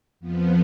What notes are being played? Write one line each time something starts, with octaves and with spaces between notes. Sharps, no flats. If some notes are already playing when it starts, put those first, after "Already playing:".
F2 F3 B3